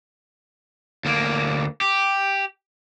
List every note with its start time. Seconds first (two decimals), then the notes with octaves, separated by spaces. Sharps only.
1.05 D2 A#3
1.81 G4